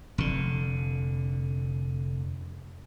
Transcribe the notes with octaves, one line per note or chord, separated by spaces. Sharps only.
F1 D3